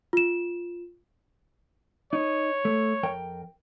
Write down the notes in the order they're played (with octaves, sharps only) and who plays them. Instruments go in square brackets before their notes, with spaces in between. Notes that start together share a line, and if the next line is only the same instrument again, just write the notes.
[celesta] F4 E7
[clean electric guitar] D#4 [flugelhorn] C#5
[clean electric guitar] A3
F2 A#4 G5